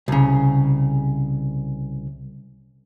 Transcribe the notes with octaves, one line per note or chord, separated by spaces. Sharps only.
C2 C#3